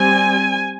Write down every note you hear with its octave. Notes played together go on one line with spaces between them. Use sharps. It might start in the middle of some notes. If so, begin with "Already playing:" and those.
Already playing: G3 C4 G#5